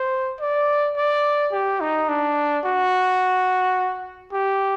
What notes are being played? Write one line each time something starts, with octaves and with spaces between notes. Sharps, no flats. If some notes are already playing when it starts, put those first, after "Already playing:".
Already playing: C5
D5
D5
G4
D#4
D4
F#4
G4